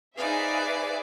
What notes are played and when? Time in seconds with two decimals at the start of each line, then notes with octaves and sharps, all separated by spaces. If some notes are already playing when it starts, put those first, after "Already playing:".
0.17 D#4 G#4 B4 C5 D5 E5 F5